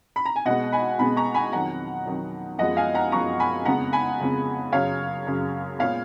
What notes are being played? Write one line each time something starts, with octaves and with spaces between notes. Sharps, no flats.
B5
A#5
G#5
B2 G#3 B3 D#5 F#5
G#5 B5
B2 G#3 B3 G#5 B5
A#5 C#6
G#5 B5
F2 D#3 F#3 F#5 A#5
F2 D#3 F#3
F#2 F3 G#3 B3 D#5 F#5
F5 G#5
F#5 A#5
F#2 F3 G#3 B3 A#5 C#6
G#5 B5
F2 C#3 G#3 B3 F#5 A#5
G#5 B5
F2 C#3 G#3 B3
F#2 C#3 F#3 C#5 F5
F#2 C#3 F#3
A#2 G#3 B3 C#5 F5